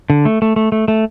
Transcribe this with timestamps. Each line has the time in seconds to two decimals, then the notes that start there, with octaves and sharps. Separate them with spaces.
0.10 D3
0.25 A3
0.42 A3
0.56 A3
0.72 A3
0.88 A3